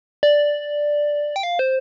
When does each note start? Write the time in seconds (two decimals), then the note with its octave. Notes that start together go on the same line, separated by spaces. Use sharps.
0.23 D5
1.36 G5
1.43 F5
1.59 C5